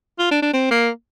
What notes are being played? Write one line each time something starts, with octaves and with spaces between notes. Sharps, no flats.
F4
D4
D4
C4
A#3